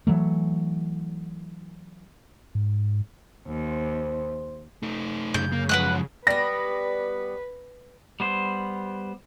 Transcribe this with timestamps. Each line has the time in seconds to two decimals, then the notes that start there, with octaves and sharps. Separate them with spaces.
0.07 E3 F#3 A3
2.55 G#2
3.48 D#2 C5
4.83 A3 D#4
5.34 F#2 C#3 G6
5.52 A#3
5.69 F3 G#3 B4 F#5 F#6
6.27 G3 B3 B4 A#6
8.20 G3 B3 C5